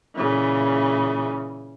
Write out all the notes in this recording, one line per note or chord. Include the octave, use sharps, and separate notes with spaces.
A#2 C#3 E3